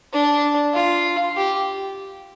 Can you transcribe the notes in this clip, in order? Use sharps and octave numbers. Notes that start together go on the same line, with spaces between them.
D4
F4
G4